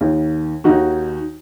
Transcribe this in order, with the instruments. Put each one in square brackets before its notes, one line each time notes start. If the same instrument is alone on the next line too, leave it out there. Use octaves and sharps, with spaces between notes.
[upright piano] D#2 D#3
D#2 D#3 D#4 F#4